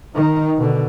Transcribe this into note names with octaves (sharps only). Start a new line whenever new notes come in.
D#3 D#4
B2 D3